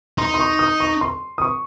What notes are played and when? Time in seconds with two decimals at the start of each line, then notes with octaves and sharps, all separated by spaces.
0.18 D#4 C6
0.34 C6
0.40 C#6
0.59 D#6
0.80 C#6
1.01 C6
1.38 D#6
1.42 C#6